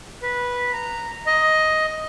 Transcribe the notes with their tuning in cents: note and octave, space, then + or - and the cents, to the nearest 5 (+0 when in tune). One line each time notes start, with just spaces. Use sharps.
B4 -10
A#5 -10
D#5 +10